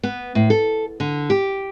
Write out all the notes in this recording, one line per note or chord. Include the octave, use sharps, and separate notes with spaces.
B3
A2
A4
D3
G4